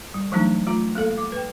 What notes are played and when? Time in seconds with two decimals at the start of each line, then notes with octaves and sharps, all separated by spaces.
0.14 G3
0.32 E3 F#3 G#3 A3 D4 D#4
0.67 A3 F4 A#5
0.95 G#3 A#3 A4 F5
1.18 D6
1.32 B4 G5